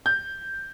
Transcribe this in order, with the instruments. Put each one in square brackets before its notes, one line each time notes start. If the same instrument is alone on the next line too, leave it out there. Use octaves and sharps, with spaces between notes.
[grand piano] G6